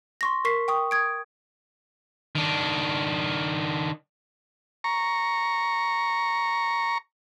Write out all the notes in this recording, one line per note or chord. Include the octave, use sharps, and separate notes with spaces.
C6 C#6 A#6
A#4 C#6 B6 C7
G5 C#6 D#6
D#6 G#6 D7
D#3 D4
A#5 C#6